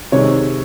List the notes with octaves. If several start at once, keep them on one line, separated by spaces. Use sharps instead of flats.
C3 D#3 G#3 C4 C#5